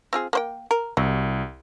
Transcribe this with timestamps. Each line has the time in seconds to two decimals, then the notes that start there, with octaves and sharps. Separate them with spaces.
0.13 C4 F4 G#4
0.33 A#3 C5 G5
0.71 A#4
0.97 C2 F#3